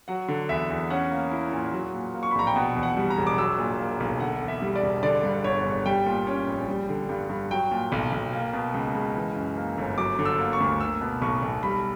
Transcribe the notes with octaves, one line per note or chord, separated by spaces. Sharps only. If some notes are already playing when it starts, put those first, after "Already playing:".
F#3 F#5
D3
E2 E5
E2
C#4 F#5
A#3
E4
A#2
F#3
A#2
A#3
C#6
B5
A#1 A#5
G5
B2 F#5
E2
F#5
G3
A#5
E1
D6
F#3 E6
A#2
A#3
B1
D3 F#5
E2
E5
G3
D5
E1
D3 D5
G2
G1 C#5
G1
G3 G5
A#2
C#4
A#1
G3
D3
G2
G2
F#3 G5
A#2
B1
B1
A#3
B2
C#2
C#2
E3
F#2
A#3
G1
F#3 D6
D3
E6
A#3
C#6
D2
A#3 E6
B2
B1 C#6
B1
G3 B5